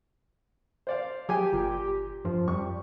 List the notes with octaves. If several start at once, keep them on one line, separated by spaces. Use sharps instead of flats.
C5 D5 F5
F#3 G4 G#4 G5 G#5
G1 A#2
G2 F3
F#2 G3 C#6